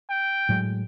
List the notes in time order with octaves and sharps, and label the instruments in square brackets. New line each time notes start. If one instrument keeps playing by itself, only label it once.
[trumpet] G5
[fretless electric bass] A2 F#3 G#3